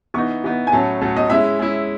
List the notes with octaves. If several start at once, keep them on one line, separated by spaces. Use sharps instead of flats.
E3 B3 D#4 C#6
E3 B3 D#4
G#5
A2 F#3 A3 C#4 A5
A2 F#3 A3 C#4
D#5
G#3 C#4 E4 E5
G#3 C#4 E4